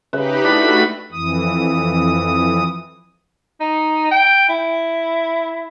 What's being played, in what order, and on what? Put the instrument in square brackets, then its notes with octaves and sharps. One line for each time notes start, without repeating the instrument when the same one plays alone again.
[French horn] C#3 [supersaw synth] D#4 G4 B5 [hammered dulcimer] B4 E5
[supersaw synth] A3 F#4 [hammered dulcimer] D4 [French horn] E4 [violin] B5
[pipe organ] F2 E3 D#6
[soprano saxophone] D#4
G5
E4